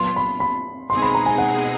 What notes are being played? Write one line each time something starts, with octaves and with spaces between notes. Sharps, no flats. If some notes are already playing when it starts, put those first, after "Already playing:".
Already playing: A#2 F#3 B3 D4 F4 C6
B5
B5
B2 G#3 C4 D#4 G#4 C6
B5
A#5
G#5
F#5